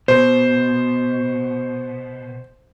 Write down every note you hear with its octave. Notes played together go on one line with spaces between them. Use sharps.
B2 C5